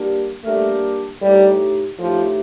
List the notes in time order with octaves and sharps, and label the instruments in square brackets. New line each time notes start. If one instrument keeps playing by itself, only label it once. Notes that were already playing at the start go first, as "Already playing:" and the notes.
Already playing: [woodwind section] G3 A#3 D4 G4 A#4
[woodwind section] G3 A#3 D4 G4 A#4 [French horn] A3
[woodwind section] A2 A3 D#4 G4 [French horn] G3
[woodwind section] A2 A3 D#4 G4 [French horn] F3